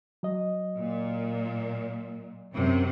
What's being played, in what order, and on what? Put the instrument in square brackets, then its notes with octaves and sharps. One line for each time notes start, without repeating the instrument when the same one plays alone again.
[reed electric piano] F#3 D#5
[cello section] A#2
F#2 C3